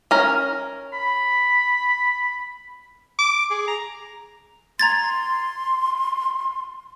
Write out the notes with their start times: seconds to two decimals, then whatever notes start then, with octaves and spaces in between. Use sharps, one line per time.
0.11 C#4 A#4
0.93 B5
3.19 D6
3.51 G#4
3.68 A#5
4.79 A#5 C6 G#6 A6